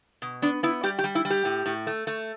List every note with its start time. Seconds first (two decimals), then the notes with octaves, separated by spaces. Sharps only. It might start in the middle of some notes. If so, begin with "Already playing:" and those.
0.22 B2
0.42 B3 D4
0.63 B3 E4
0.83 G3 G4
0.99 G4
1.04 G3
1.15 E4
1.25 G3
1.30 G4
1.45 A2
1.66 A2
1.87 A3
2.07 A3